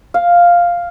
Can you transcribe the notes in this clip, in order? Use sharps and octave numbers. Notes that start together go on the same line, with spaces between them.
F5